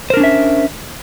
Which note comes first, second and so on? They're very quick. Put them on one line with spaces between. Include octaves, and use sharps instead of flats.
C5 A#4 D4 C#4 E5